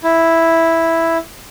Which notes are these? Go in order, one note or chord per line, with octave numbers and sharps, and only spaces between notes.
E4